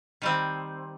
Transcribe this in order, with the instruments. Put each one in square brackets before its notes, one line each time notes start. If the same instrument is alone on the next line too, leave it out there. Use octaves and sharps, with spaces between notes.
[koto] D#3 G3 C4